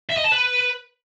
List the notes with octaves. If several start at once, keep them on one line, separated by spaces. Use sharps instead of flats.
E5
D#5
A5
B4